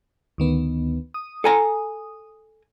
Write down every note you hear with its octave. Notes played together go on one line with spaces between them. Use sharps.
D2 D#3 B3
D#6
A4 G#5 A#5